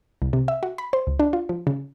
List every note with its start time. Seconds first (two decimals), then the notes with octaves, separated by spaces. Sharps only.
0.22 C2
0.33 C3
0.48 E5
0.63 F#4
0.78 B5
0.93 C5
1.07 C#2
1.20 D4
1.33 F4
1.49 F3
1.67 C#3